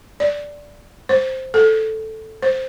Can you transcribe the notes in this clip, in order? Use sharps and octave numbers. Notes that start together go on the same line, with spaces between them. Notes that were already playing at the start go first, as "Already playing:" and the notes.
D5
C5
A4
C5